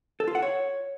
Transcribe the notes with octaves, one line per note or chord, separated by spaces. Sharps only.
A4
F4
F#5
C#5